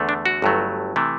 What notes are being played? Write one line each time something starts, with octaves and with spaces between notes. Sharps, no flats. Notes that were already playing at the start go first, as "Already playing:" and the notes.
Already playing: E2 D3 A3
D4
F#4
G1 G2 F#3 A3
C3 E3 A3